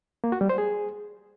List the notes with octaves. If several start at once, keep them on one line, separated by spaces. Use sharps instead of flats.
A#3
F#4
G3
C5
G#4